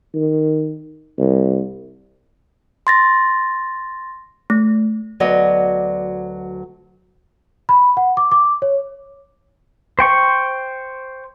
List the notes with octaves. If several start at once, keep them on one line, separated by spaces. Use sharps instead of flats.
D#3
C2
C6 A6 A#6
A3
D2 F#3 B3 D5 D#5
B5
F#5
D6
D6
C#5
C5 G5 C#6